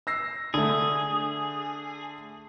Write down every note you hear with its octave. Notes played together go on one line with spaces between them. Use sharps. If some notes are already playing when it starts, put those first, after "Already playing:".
E6 A#6 C7
D3 A3 G#4